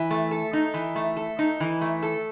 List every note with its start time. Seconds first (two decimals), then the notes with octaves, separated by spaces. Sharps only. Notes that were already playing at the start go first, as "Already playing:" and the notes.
Already playing: E3
0.11 A3
0.31 A4
0.53 D#4
0.74 E3
0.96 A3
1.17 A4
1.39 D#4
1.60 E3
1.81 A3
2.03 A4